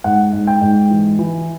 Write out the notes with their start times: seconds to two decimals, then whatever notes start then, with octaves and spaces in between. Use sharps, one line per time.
0.04 G#2 F#5
0.33 G#2
0.47 G5
0.61 G#2
0.90 E3
1.19 E3